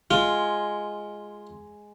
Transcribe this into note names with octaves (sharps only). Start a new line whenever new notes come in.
G#3 F4